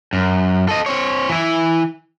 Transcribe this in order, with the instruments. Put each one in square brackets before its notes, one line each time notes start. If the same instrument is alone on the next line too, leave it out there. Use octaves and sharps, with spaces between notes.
[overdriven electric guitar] F#2
A4 D#5
C4 C#5
E3 E4